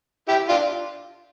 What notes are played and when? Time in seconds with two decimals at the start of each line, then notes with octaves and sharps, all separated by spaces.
0.28 E4 G4
0.49 D4 F4